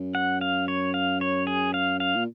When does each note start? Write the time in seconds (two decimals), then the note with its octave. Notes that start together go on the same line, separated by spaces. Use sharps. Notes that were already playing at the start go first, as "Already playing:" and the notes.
Already playing: F#2
0.15 F#5
0.41 F5
0.68 C#5
0.94 F5
1.21 C#5
1.47 G#4
1.74 F5
2.00 F5
2.15 A#2